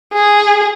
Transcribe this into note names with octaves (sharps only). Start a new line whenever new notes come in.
G#4